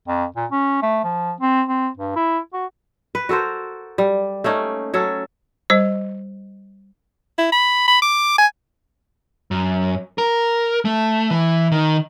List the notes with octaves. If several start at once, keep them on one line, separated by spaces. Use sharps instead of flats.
F2
A#2
C#4
A3
F3
C4
C4
G2
E4
F#4
B4
F#4 A4 A#4 C5
G3
A3 A#3 C#4 D#4
F#3 C#4 A4
G3 C5 D#5
E4
B5
B5
D6
G#5
F#2
A#4
A3
E3
D#3